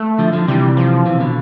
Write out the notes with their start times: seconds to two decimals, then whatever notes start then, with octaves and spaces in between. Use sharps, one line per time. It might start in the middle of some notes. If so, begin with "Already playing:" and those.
Already playing: A3
0.19 D3 F3
0.33 D3 F3
0.48 C3 E3 G3
0.77 F3
1.06 C3 E3
1.20 B2 D3